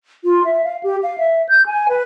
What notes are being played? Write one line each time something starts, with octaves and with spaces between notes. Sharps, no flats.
F4
E5
F5
G4
F5
E5
G6
G#5
B4